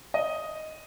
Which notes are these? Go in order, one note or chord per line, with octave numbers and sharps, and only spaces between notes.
D#5